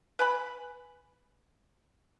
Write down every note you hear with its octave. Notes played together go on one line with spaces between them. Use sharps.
B4 G#5 B5